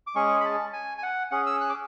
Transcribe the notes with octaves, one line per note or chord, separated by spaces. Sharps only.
D6
G#3 C#4 G#4 C#6
B5
A5
G#5
G#5
F#5
C#4 G#4 F#5
E6
F#6
D6